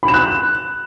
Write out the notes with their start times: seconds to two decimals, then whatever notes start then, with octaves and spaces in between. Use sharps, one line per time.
0.03 B5
0.08 E7
0.14 F#6